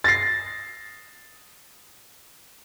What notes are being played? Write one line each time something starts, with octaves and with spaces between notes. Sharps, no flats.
A6 A#6 C7